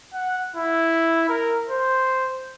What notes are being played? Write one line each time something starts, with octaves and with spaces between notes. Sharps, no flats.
F#5
E4
A#4
C5